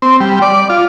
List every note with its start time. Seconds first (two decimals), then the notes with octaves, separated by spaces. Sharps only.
0.02 C4
0.20 G3
0.42 D5
0.70 F4